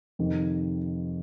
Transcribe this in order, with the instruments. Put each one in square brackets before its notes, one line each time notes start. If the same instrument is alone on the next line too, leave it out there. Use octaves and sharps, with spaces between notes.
[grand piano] F2 C3 D#3